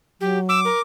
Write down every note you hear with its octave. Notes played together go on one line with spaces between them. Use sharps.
F#3 G4
D6 E6
A#4